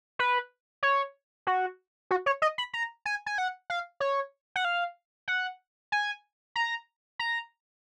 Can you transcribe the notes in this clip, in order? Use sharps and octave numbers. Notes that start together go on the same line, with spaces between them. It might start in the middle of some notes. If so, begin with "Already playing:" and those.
B4
C#5
F#4
F#4
C#5
D#5
B5
A#5
G#5
G#5
F#5
F5
C#5
F#5
F5
F#5
G#5
A#5
A#5